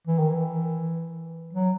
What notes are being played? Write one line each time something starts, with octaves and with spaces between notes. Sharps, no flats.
E3
D#3
E3
F#3